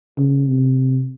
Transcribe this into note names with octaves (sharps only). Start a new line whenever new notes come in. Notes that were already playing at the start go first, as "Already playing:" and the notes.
C#3
C3